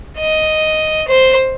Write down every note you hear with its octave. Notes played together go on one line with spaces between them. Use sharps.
D#5
C5